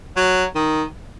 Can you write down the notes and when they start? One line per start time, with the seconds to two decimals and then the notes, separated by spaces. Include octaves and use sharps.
0.17 F#3
0.55 D#3